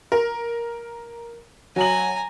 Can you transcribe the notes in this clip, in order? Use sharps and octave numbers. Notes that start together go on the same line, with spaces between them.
A#4
F#3 G#5 A#5 F#7